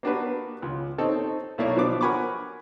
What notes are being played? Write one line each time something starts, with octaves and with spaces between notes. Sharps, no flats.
A#3 B3 D4 F#4 G4 B4
C#2
C4 D#4 A4 C#5
B1 A3 A#3 E4 C#5 D5
B2 F3 B3 D4 D6
A#4 F#5 G#5 B5 C#6 D6